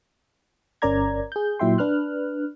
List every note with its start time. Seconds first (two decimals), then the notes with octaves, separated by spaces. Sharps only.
0.82 G1 C#4 A#4 D5 A#5 G#6
1.32 G#4 G6
1.59 A#2 F#3 E4 E5 G5 C6
1.78 D4 B4 F6 F#6